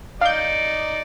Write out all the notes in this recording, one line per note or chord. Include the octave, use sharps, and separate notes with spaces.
D#4 D5 F5 G6